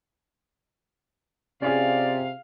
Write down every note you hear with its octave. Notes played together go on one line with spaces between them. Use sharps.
C3 C#4 F4 G#4 D5 F5